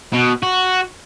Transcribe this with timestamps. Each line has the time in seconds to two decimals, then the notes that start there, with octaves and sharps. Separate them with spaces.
0.13 B2
0.43 F#4